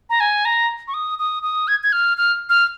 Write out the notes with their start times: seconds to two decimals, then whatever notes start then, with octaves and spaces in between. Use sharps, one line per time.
0.10 A#5
0.20 G#5
0.45 A#5
0.88 C#6
0.94 D#6
1.19 D#6
1.43 D#6
1.68 G#6
1.84 G#6
1.93 F6
2.17 F6
2.50 F6